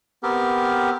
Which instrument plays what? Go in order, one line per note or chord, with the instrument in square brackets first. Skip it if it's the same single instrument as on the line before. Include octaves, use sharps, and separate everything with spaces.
[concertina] B3 C4 G4 A#4